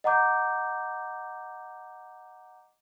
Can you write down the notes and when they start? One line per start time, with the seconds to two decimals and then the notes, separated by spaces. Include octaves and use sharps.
0.04 D#5 F#5 A#5 D6 G6